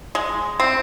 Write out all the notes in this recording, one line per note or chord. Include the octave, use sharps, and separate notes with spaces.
G#3
C4